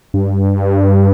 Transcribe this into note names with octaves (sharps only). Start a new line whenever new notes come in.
G2